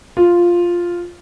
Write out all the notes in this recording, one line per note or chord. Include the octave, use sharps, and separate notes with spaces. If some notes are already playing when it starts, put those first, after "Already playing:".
F4